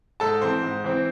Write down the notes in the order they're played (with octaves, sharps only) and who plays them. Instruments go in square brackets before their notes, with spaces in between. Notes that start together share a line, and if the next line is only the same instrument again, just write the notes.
[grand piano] G#2 A4 A5
E3 C4 C5 C6
G#2
E3 C4